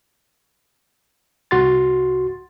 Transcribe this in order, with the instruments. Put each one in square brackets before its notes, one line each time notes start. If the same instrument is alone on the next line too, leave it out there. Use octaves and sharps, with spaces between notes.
[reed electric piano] C2 F#4 C6 A6